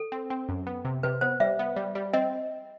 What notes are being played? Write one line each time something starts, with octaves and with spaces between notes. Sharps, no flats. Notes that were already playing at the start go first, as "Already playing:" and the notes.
Already playing: A4
C4
C4
F#2
B3
C3
C3 B4
B3 C5
G3 E5
B3
G3
G3
C4 D#5